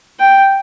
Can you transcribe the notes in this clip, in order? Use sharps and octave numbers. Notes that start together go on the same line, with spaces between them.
G5